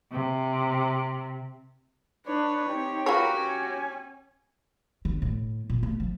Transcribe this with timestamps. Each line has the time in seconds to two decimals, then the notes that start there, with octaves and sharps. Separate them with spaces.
0.12 C3
2.26 D4 B4 C#5
2.69 C4 D#4 G4
3.06 F4 F#4 G#4 A#4 B4 C#5
3.37 C#4 G#5
5.05 D3
5.22 A2
5.70 A#2
5.83 A3
6.00 F3